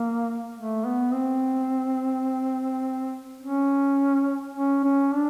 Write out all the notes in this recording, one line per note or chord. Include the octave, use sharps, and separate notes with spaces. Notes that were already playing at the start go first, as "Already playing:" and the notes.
Already playing: A#3
A3
B3
C4
C#4
C#4
C#4
D4